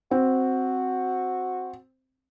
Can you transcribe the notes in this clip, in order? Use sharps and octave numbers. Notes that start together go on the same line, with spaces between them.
C4 F#4